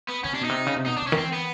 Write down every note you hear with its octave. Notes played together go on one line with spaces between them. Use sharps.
B3
C#3 C#4
C3 D4
B2 D#4
C3
C#3
C3
B2 D#4
D4
C3
C#4
D#3
E3 C4
B3